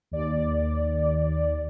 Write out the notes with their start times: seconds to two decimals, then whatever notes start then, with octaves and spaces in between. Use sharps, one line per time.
0.11 D#2 D5